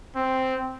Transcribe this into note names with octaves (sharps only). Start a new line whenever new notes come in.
C4